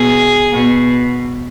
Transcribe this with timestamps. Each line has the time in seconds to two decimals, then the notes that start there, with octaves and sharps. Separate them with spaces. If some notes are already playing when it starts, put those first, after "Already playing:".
Already playing: B2 G#4
0.51 B2